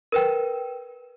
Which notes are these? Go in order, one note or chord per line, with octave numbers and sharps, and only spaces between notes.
A#4 B4 G5